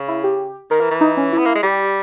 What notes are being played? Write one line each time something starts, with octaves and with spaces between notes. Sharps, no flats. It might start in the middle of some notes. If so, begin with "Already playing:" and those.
Already playing: C#3
E4
G4
D#3 A#4
E3
E3
D#4
C#4
E4
B3
A#3
G#3
G3 G4